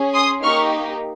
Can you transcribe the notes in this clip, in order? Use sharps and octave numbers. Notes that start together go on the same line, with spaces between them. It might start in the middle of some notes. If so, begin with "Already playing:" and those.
Already playing: C#4 G#4
C6 D#6
A#3 D#4 G4 C#6 F6